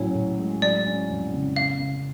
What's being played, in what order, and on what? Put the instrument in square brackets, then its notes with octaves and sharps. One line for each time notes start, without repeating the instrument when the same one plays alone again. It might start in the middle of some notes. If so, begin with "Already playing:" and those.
Already playing: [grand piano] A2 F#3 C#4 [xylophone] C#5
[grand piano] A2
G#3
[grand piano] F#3 [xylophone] D5
[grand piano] C#4
F2
C#3
[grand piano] B3 [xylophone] F5
[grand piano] C#3